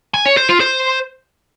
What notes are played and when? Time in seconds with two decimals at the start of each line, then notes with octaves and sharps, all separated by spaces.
0.14 G#5
0.26 C#5
0.37 C5
0.49 F4
0.60 C5